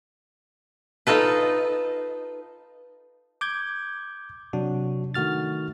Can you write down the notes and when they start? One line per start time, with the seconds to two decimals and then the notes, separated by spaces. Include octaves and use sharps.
1.07 D#4 F4 A4 B4
3.41 D6 G6 G#6
4.53 C3 F#3 D4 F#4
5.14 D#3 A3 F#4 F6 A6